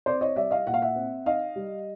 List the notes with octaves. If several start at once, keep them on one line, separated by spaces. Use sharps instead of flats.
C4 C5 D5
C#5 D#5
G3 D5 E5
D#5 F5
A#2 F#5
F5
E5 F#5
C4
D#4 D#5 F5
G3